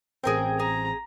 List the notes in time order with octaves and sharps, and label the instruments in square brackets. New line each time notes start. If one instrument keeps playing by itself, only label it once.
[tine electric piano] A1 C4 [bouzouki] G#4 A#4 G5
[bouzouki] G#4 [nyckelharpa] A#5